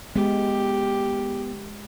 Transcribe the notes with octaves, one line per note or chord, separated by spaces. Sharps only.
G#3 B3 G4